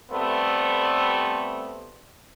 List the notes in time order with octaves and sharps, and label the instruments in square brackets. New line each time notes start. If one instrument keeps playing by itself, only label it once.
[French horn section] G3 A3 B3 C4